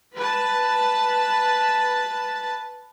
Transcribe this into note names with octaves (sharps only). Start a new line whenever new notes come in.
B4 A5